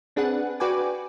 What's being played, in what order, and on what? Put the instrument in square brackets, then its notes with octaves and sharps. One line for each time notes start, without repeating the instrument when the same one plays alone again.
[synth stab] C4 D4 G#4 B4 F#5
F#4 B4 D5 G5 G#5 D6